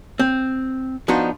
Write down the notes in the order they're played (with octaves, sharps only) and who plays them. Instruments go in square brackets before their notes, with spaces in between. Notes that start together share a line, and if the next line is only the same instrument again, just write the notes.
[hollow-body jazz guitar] C4
F3 B3 D4 D#4 F4 F#4